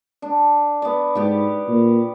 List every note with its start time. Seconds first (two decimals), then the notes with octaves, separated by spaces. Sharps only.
0.22 D4
0.82 B3 D5
1.15 G#2 B3 G4
1.68 A#2